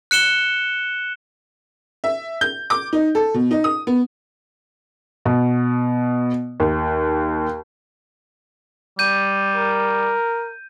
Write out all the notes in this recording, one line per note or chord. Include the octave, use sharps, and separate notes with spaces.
F#6 C#7 E7 G7
E5
G6
D6
D#4
A4
B2
D#4
D#6
B3
B2
D#2
G3 G6 D#7
A#4